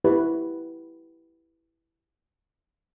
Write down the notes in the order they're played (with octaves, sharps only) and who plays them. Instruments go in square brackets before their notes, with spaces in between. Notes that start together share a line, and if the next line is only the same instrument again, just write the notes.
[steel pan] E4 G4 B4